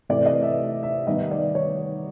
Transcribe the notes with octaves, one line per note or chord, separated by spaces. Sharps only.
C3 E3 A3 D5
D#5
E5
E5
D#3 G3 B3 D#4 D#5
D5
C#5